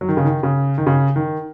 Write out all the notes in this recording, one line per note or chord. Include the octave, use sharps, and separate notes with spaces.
F#3
D#3
C#3
D#3
C#3
D#3
C#3
D#3